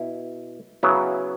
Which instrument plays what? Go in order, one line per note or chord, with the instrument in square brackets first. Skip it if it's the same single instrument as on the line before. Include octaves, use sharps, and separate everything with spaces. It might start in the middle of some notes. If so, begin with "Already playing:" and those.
Already playing: [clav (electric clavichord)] B2 E4
C#3 F#3 B3 E4